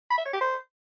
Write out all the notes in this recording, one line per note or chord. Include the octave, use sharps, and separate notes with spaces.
B5
E5
C#5
G4
C5